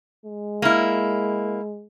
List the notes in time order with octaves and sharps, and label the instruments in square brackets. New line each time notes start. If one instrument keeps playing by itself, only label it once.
[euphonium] G#3
[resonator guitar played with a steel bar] A#3 E4